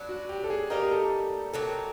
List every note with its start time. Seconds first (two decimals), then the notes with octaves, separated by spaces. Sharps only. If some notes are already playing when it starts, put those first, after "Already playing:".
Already playing: F#3 B3 D4
0.09 F#4
0.29 G4
0.44 A4
0.50 G#4
0.70 G3 A#3 D#4 A#4
0.91 A4
1.53 D#3 F#3 A#3 A4